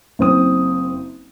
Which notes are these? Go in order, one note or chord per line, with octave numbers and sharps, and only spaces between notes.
F#1 C4 D#6